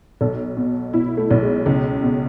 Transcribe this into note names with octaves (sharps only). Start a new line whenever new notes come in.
B1 A4
B2
B2 E4
A3
B1
G#3
C#2
B2